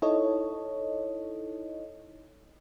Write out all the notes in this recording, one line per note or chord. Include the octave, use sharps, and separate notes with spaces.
D#4 E4 A4 C#5 D#5